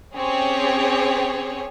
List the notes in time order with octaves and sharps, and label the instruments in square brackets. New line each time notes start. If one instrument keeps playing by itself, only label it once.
[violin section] C4 C#4 G4 G#4 C#5